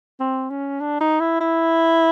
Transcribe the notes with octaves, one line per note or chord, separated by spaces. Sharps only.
C4
C#4
D4
D#4
E4
E4